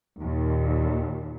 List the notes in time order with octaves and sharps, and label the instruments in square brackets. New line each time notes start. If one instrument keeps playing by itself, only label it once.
[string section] D#2 A#2